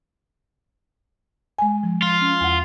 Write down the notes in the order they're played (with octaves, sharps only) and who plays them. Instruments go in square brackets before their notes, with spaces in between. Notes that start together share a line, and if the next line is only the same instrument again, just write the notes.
[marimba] G#3 G#5
F3
[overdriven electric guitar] F4
[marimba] C#4
E2 F#5